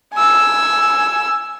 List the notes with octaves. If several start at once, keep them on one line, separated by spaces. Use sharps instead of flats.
G#5 E6